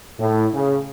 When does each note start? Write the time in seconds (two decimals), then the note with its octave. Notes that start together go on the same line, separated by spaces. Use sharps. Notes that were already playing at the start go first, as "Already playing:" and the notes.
0.19 A2
0.53 C#3